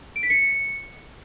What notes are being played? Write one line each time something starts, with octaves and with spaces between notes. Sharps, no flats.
D7
B6
C#7